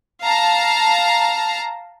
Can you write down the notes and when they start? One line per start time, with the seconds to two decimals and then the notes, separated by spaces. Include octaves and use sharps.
0.21 F5 A5 A#5